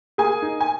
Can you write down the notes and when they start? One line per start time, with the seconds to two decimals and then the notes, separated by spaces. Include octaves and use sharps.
0.18 A#3 G#4 G#5
0.42 D#4
0.61 G#5